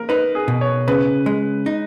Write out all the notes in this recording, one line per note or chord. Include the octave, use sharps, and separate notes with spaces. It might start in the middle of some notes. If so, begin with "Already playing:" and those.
Already playing: A#3 A#4
D#4 B4
G#4
B2
C#5
C#3 B4
G#3
D#4